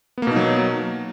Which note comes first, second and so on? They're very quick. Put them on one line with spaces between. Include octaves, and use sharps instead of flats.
B3 A#3 B2 D#4 F#3